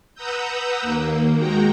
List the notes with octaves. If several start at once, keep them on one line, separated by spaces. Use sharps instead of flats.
B4 F#5 A#5 D#6 E6 G6
D#2 A#3
G#3 F#4 G5 A#5